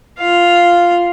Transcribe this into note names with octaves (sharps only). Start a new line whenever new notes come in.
F4 F5